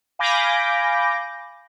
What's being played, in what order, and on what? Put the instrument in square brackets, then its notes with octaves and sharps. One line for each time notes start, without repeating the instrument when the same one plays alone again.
[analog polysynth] F5 G#5 B5 D6 G6 A#6